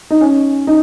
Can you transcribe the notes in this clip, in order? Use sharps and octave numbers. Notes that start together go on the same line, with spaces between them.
D#4
C#4
D#4